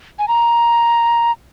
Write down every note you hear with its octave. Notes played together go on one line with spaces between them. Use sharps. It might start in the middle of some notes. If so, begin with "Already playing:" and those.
G#5
A#5